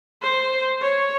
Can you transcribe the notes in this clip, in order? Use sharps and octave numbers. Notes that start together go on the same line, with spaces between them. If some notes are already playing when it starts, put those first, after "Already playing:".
C5
C#5